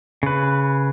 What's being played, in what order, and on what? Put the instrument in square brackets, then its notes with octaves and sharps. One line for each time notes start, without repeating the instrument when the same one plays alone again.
[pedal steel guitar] C#3 B4